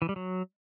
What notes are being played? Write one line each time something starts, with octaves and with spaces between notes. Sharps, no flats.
E3
G3
F#3